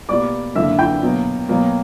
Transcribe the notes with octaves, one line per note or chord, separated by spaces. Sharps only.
B2 G3 A#3 D5 D6
F#2 D3 A#3 E5 E6
G5 G6
B2 F#3 A#3
B2 F#3 A#3